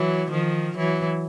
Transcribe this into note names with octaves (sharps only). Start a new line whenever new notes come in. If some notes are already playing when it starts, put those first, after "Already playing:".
Already playing: E3 F#3
D#3 F3
E3 F#3